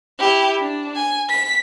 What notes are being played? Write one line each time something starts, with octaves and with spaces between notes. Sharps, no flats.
E4 G4
D4
G#5
B6